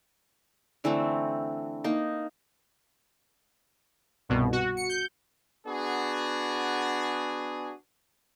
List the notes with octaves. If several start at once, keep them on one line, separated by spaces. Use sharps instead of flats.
D3 E3 A3 C4
A#3 D#4
C2 G2 B2
F#4
C#7
G6
B3 D4 F#4 G#4